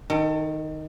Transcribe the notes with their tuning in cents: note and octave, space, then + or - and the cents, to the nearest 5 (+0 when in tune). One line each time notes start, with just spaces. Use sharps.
D#3 +0 A4 +35